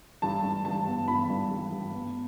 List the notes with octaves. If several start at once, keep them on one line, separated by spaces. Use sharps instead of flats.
G2 A5
G2
G2 A5
B3
G2 B5
G2
G2
G2
B3